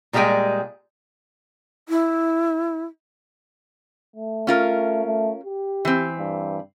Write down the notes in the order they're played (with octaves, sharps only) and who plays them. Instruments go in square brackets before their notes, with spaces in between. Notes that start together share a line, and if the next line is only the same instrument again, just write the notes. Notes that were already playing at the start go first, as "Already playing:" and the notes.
[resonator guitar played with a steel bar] A#2 G3 G#3 G#4 G5 G#5
[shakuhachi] E4
[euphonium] A3
[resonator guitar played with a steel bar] C#4 F4 A#4
[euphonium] A3
G4
[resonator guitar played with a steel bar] E3 C4
[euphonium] G2